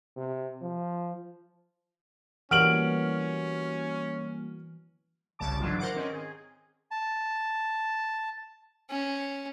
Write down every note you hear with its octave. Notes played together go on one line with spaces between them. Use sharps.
C3
F3
E3 G3 A#3 C#4 F#4 F6 D7 F#7
G1 C2 C#3 A5 D6
G#2 D3 E3 F#3 D4 F4
A#4 C5 F#5 D6
D#3 C4 C#4
G#4
A5
C#4